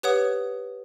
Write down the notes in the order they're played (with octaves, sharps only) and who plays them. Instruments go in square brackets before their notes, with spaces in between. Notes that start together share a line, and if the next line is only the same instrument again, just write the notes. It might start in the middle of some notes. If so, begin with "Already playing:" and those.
[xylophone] G4 B4 C#5 F#5 D#6